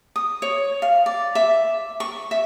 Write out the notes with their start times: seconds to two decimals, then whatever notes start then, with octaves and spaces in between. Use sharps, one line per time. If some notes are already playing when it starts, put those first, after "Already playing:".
0.16 D#6
0.42 C#5
0.82 F5
1.06 D5
1.35 E5
2.00 C#6
2.31 E5